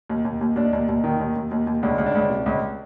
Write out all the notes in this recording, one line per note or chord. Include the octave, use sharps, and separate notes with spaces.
D#2
D#2
D#2
D#2 D4
D#2
D#2
D#3
D#2
D#2
D#2
D#2
C#2 D4
C#2
D4
C#2
C3
C#2